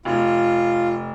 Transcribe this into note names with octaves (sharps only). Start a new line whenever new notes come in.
F1 F4